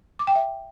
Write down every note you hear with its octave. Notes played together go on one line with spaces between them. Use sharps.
D6
G5
E5